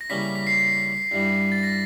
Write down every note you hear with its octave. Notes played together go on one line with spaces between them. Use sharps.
A#6
C#3 E3 G3 A#3 C#4 B6
B6
C7
B6
G2 E3 G3
A6
A#6